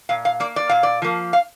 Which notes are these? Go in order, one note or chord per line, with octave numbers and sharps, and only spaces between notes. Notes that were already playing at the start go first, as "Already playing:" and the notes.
A#2 F5
F5
A#3 D5
D5
A#2 F5
D5
F3 A#3
F5